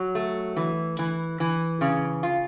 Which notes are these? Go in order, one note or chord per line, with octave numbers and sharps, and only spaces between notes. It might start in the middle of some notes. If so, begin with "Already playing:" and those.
Already playing: F#3
A3
E3
E3
E3
C#3
F4